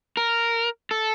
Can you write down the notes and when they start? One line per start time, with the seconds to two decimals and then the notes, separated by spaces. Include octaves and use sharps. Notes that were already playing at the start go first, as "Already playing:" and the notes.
0.17 A#4
0.91 A4